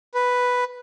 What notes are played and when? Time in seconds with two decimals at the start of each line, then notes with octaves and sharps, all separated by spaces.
0.14 B4